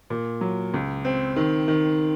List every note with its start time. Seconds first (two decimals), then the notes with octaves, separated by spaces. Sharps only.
0.10 A#2
0.41 F#3
0.74 C#2
1.05 C4
1.36 D#3
1.68 D#3